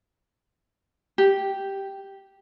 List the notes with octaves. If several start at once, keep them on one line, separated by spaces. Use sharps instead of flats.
G4